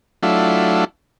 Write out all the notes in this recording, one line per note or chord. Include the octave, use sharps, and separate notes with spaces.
F#3 A3 D4 E4 F4